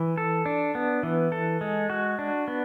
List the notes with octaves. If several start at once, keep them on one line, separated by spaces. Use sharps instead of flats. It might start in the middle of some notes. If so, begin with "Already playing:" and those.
Already playing: E3
A4
D4
B3
E3
A4
G#3
F#4
D4
B3